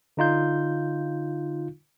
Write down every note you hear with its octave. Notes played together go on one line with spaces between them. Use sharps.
D3 D#4 F4 G6